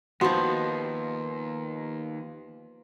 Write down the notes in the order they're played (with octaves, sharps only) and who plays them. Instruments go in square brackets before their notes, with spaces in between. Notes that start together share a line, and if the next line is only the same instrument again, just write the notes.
[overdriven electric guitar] D#2 [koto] F3 B3 [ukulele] F#4 [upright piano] C6